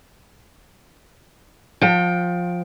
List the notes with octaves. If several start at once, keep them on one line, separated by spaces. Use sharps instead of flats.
F3 G5